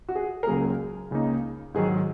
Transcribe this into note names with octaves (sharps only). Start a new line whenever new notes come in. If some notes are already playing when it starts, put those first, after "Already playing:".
F#4
G#4
A#4
C#2 C#3 F#3 A#3 G#4
C#2 C#3 A#3 D#4
G#2 D#3 F#3 G#4